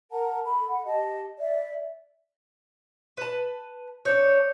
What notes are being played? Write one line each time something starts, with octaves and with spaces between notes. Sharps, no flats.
A#4 F#5 A5 A#5
A4 B5
F#5
G4 D#5 A5
D5 E5
B4 A5
D4 C5 C#5 G6 C#7